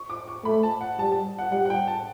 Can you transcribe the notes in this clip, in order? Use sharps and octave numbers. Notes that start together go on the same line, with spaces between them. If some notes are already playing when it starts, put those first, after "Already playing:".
Already playing: C#6
D6
C#6
A3 B5
A5
F#5
G3 A5
A5
F#5
G3 F#5
F#5
G5
A5